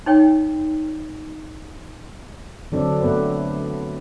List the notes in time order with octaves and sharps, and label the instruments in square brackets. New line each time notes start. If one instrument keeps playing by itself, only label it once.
[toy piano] D#4 C#5 G5
[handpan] D3 F#3 C4 D4 A4 D5
A3 B3 B4